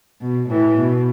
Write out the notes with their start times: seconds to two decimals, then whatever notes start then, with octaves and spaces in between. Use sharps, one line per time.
0.21 B2
0.49 A2 E3
0.77 B2